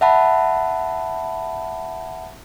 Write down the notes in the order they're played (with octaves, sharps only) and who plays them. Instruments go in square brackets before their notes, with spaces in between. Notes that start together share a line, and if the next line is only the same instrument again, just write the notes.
[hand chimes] E5 F#5 A5 B5